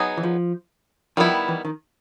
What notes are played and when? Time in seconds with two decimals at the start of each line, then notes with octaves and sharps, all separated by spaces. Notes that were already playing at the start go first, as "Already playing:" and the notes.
Already playing: F#3 B3 D#4 G#4
0.18 E3
0.23 F3
1.17 D#3 F3 G3 B3 E4
1.48 E3
1.65 D#3